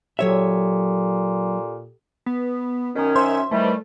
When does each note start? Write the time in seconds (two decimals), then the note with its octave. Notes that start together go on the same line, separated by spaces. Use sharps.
0.19 A#2 F#3 G4 A4 C#5 E5
2.26 B3
2.95 F#2 D#3 C#4
3.16 C5 E5
3.51 D#3 E3 G3 A3